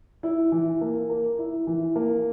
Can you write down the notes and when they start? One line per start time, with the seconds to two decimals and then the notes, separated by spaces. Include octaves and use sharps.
0.23 E4
0.52 E3
0.81 A#3
1.09 A#4
1.38 E4
1.67 E3
1.96 A#3